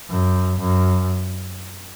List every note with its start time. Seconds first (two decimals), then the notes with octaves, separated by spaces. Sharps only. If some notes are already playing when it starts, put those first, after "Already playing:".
0.10 F#2
0.60 F#2